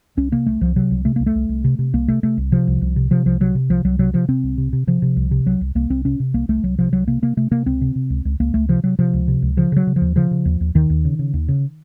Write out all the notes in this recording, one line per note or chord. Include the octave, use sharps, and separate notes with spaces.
C2 C#4
C3 A#3
C2 A3
C2 F3
C3 F#3
C2
C3 A3
C2 A#3
A3
C2
C2
C3
C3
C2 A#3
C3 A3
C3 A3
C2
C3 F3
C2
C2
C3
C3 F3
C2 F3
C3 F#3
C3
C2 F3
C2 F#3
C3 F#3
C3 F3
C3 C4
C2
C3
C3
C3 F3
C3
C2
C3
C2 F#3
C2
C2 A#3
C2 C4
C3 C#4
C3
C2 A#3
C2 A3
C2 F#3
C3 F3
C2 F#3
C3 A#3
C3 A#3
C3 A3
C3 A#3
C#2 C4
C3
C3
C#2
C#2
C#2 A#3
C#2 A3
C3 F3
C3 F#3
C3 F3
C#2
C3
C#2
C#3 F3
C#3 F#3
C#3
F3
D#2
C#3 F3
C#3
D#2
D#2
D#2 D#3
D#2
C#3
C#3
D#2
C#3